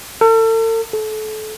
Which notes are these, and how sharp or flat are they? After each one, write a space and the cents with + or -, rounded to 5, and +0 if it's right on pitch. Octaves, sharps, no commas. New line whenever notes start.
A4 +40
A4 -30